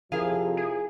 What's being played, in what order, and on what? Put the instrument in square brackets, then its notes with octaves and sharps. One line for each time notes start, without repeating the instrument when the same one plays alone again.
[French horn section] F2 C3 F3 [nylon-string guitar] E4 A#4 F5 [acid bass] G#4
[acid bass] G#4